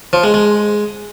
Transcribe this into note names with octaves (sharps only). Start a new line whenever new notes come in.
F3
G#3
G#3